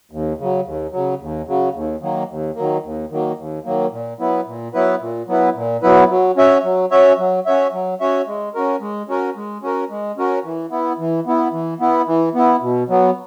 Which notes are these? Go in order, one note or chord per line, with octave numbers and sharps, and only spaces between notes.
D#2
C#3 F#3
D#2
C#3 F#3
D#2
C#3 F#3
D#2
D#3 F#3 A#3
D#2
D#3 F#3 A#3
D#2
D#3 F#3 A#3
D#2
D#3 F#3 A#3
A#2
F#3 B3 E4 B4
A#2
F#3 B3 E4 B4
A#2
F#3 B3 E4 B4
A#2
F#3 B3 E4 B4
F#3
C#4 F#4 C#5 E5
F#3
C#4 F#4 C#5 E5
F#3
C#4 F#4 C#5 E5
F#3
C#4 F#4 C#5 E5
G#3
C#4 F#4 A#4
G#3
C#4 F#4 A#4
G#3
C#4 F#4 A#4
G#3
C#4 F#4 A#4
E3
B3 E4
E3
B3 E4
E3
B3 E4
E3
B3 E4
B2
F#3 B3